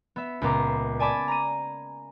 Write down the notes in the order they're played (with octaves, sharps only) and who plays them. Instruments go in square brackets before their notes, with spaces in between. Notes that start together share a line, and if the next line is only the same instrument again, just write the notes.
[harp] B3 E5
C#2 A#2 B3 A#5 D6 C7
D5 G#5 A5 B5 D6
A#5 D#7